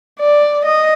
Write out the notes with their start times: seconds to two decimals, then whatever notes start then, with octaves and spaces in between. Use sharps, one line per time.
0.20 D5
0.65 D#5